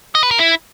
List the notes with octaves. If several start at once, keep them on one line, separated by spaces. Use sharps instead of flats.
D#5
B4
A#4
E4